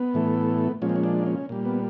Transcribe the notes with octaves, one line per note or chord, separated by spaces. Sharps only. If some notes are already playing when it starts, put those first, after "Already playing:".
Already playing: B3
A2 E3 A3
A#2 F3 G#3 C#4
C4
C#4
D4
C#4
A#2 G3
B3